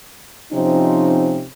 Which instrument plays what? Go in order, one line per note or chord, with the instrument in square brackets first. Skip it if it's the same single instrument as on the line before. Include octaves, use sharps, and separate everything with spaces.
[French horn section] C3 F3 C4 C#4 D#4